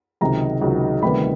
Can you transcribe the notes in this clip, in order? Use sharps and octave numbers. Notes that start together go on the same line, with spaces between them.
C#2 C3 D#3 F#3 A#5
C#2 C3 D#3 F#3
D2 C3 D#3 G3 B3 B5